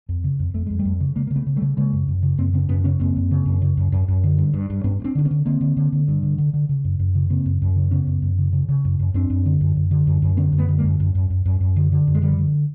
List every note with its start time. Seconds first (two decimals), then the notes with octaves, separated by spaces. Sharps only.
0.09 F2
0.24 C#3
0.39 F2
0.54 F2 A3
0.67 F2 G#3
0.79 G3 A3
0.85 F2
1.00 C#3
1.16 C#3 G#3 A#3
1.27 A#3
1.30 C#3
1.36 A3 B3
1.47 C#3
1.56 G3 A3
1.62 C#3
1.77 C#3 G#3 A#3
1.93 F#2
2.08 F#2
2.23 C#3
2.38 F#2 A#3 C4
2.53 C#3 B3 C#4
2.69 F#2 B3 C#4
2.84 C#3 B3 C#4
3.00 F#2 A#3 C4
3.16 F#2
3.31 C#3
3.46 F#2
3.62 C#3
3.77 F#2
3.92 F#2
4.08 F#2
4.24 D3
4.38 G2
4.54 G2
4.70 G2
4.84 G2 B3 C#4
5.00 G2
5.04 C4 D4
5.15 D3 D4
5.25 B3 C#4
5.31 D3
5.46 D3 A#3 C4
5.61 D3
5.77 D3
5.92 D3
6.08 G2
6.23 D3
6.38 D3
6.54 D3
6.69 C#3
6.84 F#2
6.99 F#2
7.15 C#3
7.30 C#3 A#3 C4
7.46 F#2
7.62 F#2
7.76 C#3
7.91 C#3 B3 C#4
8.07 F#2
8.22 F#2
8.38 C#3
8.53 C#3
8.69 C#3
8.85 F#2
8.99 F#2
9.14 F#2 C4 D4
9.30 F#2
9.46 D3
9.61 F#2
9.77 F#2
9.91 D3
10.07 F#2
10.22 F#2
10.37 D3 B3 C#4
10.53 F#2
10.58 A3 B3
10.68 D3
10.78 G#3 A#3
10.84 F#2
11.00 F#2
11.15 F#2
11.30 F#2
11.46 F#2
11.61 F#2
11.76 D3
11.92 D3
12.07 F#2
12.15 G#3
12.22 D3 F3 G3
12.38 D3